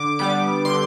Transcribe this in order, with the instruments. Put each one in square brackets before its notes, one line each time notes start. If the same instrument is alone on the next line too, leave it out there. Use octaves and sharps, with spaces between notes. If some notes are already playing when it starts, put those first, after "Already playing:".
Already playing: [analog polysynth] D3 D6
G3 B3 D6
D3 C6